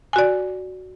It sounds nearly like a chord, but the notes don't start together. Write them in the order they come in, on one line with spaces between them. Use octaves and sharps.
G#5 F#4 D5